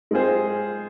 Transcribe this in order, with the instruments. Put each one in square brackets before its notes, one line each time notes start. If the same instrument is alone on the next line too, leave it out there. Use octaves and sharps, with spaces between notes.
[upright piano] G#3 C4 F4 G#4 C5